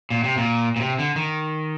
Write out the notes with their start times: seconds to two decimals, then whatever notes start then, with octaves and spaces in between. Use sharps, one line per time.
0.10 A#2
0.24 C3
0.37 A#2
0.76 A#2
0.80 C3
0.99 D3
1.16 D#3